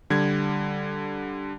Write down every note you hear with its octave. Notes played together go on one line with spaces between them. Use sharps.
D3 G3 G#6